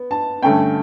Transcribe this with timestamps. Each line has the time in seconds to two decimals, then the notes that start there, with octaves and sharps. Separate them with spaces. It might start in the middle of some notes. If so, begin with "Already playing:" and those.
Already playing: B3
0.11 A5
0.43 G2 D3 A3 C#4 G5